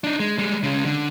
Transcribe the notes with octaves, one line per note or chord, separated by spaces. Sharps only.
D4 D#4
G#3
G3 G#3
C#3 G#3
D3